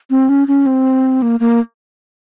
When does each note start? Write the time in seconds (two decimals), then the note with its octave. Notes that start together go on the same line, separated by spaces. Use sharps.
0.10 C4
0.29 C#4
0.48 C#4
0.66 C4
1.22 A#3
1.40 A#3